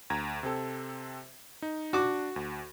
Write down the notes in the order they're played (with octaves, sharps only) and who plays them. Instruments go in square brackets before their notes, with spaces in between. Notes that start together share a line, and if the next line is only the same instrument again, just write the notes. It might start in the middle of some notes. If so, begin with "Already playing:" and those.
[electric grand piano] D2 A#5 G#6
C3 C4 A4
D#4
[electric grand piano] D4 [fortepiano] F#4 D6
[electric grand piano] D2